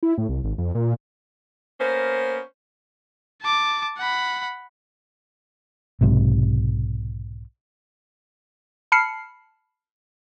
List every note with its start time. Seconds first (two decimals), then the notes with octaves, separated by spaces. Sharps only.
0.03 E4
0.18 A2
0.29 C2
0.44 G#1
0.58 F2
0.75 A#2
1.80 A#3 B3 C#4 C5
3.42 A5 D6
3.98 F#5 B5
6.01 B1 G#2 C3
8.92 A5 B5 F6 C7 C#7